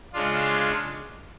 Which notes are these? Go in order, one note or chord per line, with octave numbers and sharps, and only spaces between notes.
C#3 G#3 D4 F4